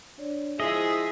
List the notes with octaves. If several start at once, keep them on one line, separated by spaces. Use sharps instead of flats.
D4 C#5 D5
F3 G#3 E4 G#4 C5 D#5 E5